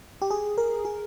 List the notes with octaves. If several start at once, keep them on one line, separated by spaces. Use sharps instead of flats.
G4
G#4
A#4
G#4